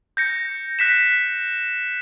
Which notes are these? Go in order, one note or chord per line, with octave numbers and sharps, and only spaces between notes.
G6 A#6 C#7
F#6 B6 E7